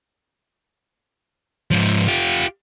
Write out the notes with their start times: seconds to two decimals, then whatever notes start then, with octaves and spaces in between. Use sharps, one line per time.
1.71 G#2 F3
2.08 F4 G4